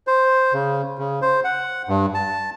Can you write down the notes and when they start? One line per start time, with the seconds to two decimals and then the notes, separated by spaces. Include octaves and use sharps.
0.07 C5
0.53 C#3
0.98 C#3
1.22 C5
1.44 F#5
1.89 G2
2.14 A5